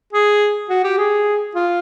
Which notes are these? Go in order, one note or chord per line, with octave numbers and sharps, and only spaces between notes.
G#4
F#4
G4
G#4
F4